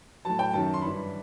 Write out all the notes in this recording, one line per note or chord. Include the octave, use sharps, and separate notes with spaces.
A2 F#3 A5
G5
F#2 D#3 F#3 A5
C6
G2 E3 B5